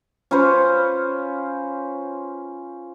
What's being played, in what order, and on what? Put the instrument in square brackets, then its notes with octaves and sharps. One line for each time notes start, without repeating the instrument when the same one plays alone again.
[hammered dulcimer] C#4 F4 B4 C5